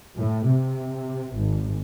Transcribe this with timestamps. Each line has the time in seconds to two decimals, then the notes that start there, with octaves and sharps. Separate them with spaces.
0.18 A2
0.48 C3
1.35 G#1